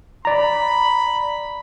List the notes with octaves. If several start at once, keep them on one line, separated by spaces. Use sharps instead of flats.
D5 A#5 B5